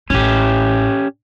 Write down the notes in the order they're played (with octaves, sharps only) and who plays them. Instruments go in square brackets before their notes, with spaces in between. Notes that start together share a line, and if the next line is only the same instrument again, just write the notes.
[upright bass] A1 E4 [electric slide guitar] C#4 G4